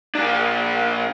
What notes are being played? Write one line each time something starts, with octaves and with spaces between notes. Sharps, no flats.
A#2 D4